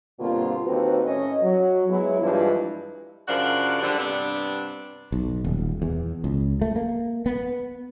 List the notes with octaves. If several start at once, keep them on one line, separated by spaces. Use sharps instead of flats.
G2 B2 D3 A#3 C4 F4
D#2 C4 F#4 A4 B4
A2 C#4 C#5 D#5
F#3
F#3 G#3 B3 E4
G2 E3 F3 G#3 E4 B4
F#2 C#3 F3 D4 A#4 F#5
D3 G3
G2 C3 B3 D4
B1
D#1
E2
C#2
A3
A#3
B3